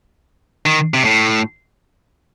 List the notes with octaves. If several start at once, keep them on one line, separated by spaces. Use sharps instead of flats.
D#3
C3
A2